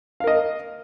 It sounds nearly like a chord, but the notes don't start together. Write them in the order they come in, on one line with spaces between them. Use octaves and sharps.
F5 A#4 D#5